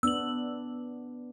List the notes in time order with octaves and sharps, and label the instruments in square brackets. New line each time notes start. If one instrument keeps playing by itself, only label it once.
[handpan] B3 D4 [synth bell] E6 F#7